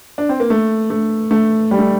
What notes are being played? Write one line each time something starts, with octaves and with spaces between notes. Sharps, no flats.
D4
C4
A#3
A3
A3
A3
G3
A3